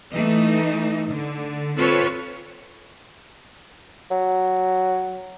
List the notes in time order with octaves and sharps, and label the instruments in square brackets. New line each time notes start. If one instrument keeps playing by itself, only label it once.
[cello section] E3 A3 D#4
D3
C4 F4 A4 B4 C#5
[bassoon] F#3